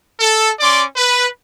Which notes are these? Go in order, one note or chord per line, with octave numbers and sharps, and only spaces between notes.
A4
C#4 D5 C6 D6
B4